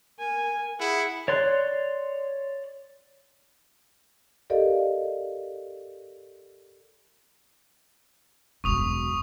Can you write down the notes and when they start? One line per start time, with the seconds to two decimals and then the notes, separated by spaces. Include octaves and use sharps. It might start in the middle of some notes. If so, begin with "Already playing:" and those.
0.19 A#4 G#5
0.80 E4 G#4 F#5
1.28 C#5 D5 C6 F#6
4.50 G4 A4 A#4 D5 D#5 F5
8.64 E1 F#2 C#6 D#6 F7